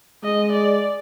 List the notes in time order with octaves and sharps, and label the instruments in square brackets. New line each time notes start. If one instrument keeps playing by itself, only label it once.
[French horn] G#3 [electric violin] D#5
[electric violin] D5